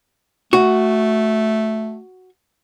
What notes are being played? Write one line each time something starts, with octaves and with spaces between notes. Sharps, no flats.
A3 F#4